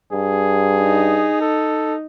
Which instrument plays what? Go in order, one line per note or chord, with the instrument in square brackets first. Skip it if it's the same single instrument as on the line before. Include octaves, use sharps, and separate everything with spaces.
[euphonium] G2 [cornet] G#4
[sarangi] D#4
[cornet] A4